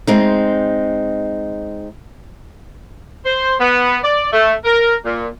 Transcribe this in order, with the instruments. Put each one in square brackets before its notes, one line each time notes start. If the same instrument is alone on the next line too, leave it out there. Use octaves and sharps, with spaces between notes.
[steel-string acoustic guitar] G#3 C4 D#4
[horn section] C5
B3
D5
A3
A#4
A#2